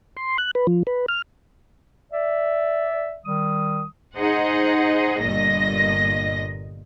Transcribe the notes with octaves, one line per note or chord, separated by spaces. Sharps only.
C6
F#6
B4
F3
B4
F6
D5 E5
D#3 G3 D#6
D#4 G#4 C5 D#5 F#5
G1 G2 A#2 D#5 A#6